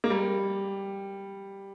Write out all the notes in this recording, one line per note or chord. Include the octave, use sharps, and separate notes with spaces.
A#3
G3